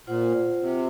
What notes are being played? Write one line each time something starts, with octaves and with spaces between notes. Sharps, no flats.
A#2 F4 C5 F#5
C3